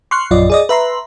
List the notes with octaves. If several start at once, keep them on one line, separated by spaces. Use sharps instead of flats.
C6 C#6 F6 F#6 C7
A#1 F#2 F4 D5 D#5
G#4 D5 D#5
B4 E5 A#5 C6